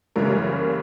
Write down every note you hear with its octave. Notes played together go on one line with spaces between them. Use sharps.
F#1 F#2 C#3 E3 G3 A#4